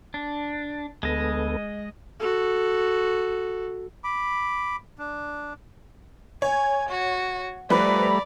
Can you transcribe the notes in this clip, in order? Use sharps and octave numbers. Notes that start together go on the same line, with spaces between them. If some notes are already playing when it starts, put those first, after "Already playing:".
D4
D2 G#3 B3 A4 D#5
F#4 A4
B5 D6
D4
C#5 G#5
F#4
F3 G3 A3 B4 D5 A#5 B5